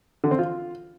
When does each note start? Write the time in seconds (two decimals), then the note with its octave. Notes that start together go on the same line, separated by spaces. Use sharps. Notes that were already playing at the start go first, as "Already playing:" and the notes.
0.24 D3
0.31 C4
0.38 F4